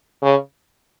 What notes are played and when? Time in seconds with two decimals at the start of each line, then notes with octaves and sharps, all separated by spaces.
0.23 C#3